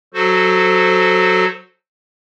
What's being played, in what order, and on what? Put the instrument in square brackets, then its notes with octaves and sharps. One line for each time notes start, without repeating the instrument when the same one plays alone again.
[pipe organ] F#3 F#4 A4 C5